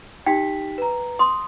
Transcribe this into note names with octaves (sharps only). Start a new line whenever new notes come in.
D#4 G4 G5 B6
B4 A#5
C6 D#6